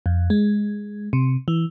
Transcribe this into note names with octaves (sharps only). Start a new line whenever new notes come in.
F2
G#3
C3
E3